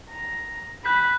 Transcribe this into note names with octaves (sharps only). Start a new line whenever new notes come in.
A#5
B5 F#6 G6 B6